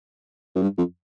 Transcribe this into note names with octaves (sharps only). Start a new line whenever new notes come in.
F#2
G2
F2